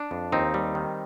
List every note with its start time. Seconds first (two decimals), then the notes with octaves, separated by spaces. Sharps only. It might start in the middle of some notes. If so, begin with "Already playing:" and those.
Already playing: D4
0.11 F2
0.32 D#2 C4 D#4
0.54 G3
0.75 D#3